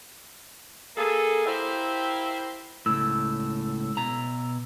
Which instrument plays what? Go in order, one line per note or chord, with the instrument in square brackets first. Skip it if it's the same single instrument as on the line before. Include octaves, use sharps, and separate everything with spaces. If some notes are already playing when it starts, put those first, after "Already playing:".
[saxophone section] A#3 G#4 A4
E4 G4 A#4 C5 E5 F5
[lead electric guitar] C#2 A2 [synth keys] E6
[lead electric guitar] B2 A#5